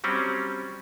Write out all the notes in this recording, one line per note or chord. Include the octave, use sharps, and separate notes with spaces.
F#3 G3 C4 C#4